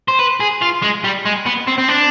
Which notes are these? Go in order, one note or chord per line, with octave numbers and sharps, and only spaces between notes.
C5
B4
G#4
F4
G#3
G3
G#3
B3
C4
C4
D4